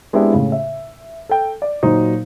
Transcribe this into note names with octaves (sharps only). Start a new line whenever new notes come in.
G#3 B3 C4 D4 E4 G4
A2 C#3
E5
A4 G5
D5
A#2 F#3 D#4 C5